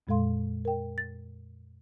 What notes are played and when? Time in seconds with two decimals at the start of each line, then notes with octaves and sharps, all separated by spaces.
0.07 F2 A#2 G#3 A4 F5 C6
0.65 A#4 G5
0.98 A6